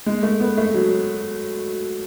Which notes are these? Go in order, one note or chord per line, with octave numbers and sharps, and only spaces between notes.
G#3
A3
B3
A3
F#3